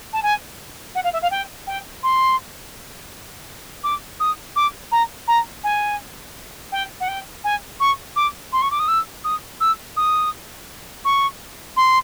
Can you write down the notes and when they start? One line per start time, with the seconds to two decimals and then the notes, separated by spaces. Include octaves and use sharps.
0.13 A5
0.23 G#5
0.95 F#5
1.04 F5
1.13 E5
1.22 F5
1.31 G5
1.67 G5
2.03 C6
3.84 D6
4.20 D#6
4.56 D6
4.92 A#5
5.28 A#5
5.64 G#5
6.72 G5
7.00 F#5
7.08 G5
7.44 G#5
7.80 C#6
8.16 D6
8.52 C6
8.62 C#6
8.71 D6
8.79 D#6
8.88 E6
9.24 D#6
9.60 E6
9.97 D#6
11.05 C#6
11.77 C6